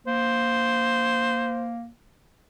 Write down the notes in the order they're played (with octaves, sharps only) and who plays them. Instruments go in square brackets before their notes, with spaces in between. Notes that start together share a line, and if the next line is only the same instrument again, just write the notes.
[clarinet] A#3 [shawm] C5